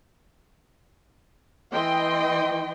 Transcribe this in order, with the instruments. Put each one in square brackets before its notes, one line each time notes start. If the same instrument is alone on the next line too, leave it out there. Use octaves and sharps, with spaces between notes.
[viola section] E3 D#5 G5 C6